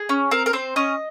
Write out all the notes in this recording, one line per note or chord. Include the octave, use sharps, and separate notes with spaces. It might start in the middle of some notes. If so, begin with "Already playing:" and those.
Already playing: G#4
C#4
C4 A#4
A#4
C4 C5
C#4 D#5